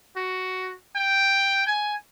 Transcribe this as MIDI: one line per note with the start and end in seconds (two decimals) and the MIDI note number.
0.17 0.74 66
0.96 1.67 79
1.67 1.94 80